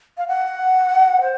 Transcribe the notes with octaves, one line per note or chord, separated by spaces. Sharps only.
F5
F#5
C5